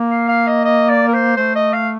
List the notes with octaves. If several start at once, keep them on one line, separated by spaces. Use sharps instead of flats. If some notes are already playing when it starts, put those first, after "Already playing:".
Already playing: A#3
F5
F5
D#5
D#5
D5
A#4
C5
A3 C5
D#5
F5